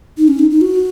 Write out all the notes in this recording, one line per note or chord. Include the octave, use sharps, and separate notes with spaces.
D#4
C#4
D#4
D#4
F#4